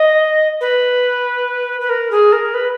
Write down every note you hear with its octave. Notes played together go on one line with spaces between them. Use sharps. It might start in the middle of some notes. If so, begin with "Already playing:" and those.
Already playing: D#5
B4
B4
A#4
G#4
A#4
B4